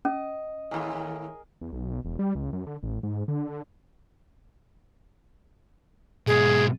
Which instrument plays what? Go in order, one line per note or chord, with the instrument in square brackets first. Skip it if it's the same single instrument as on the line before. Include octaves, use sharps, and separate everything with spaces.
[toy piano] C#4 [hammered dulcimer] D#5
[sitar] D#2 A2 [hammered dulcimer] G#4 A#4
[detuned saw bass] E2
B1
E1
G3
C#2
F#2
D3
A1
G#2
D3
[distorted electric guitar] G#2 B2 [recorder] G#4